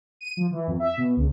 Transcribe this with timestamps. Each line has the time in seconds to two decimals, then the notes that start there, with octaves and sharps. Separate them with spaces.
0.21 D#7
0.37 F3
0.51 E3
0.67 F2
0.80 E5
0.97 B2
1.17 C#2